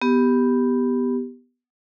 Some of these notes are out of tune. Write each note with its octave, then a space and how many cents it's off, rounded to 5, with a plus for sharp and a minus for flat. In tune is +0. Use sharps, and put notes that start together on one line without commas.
B3 +0 G4 +0